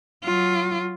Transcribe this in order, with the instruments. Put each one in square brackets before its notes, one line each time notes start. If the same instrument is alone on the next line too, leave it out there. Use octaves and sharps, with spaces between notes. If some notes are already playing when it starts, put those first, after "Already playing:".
[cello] F#3 F4